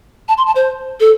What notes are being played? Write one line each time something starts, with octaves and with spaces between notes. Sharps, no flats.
A5
C6
A5
C5
A4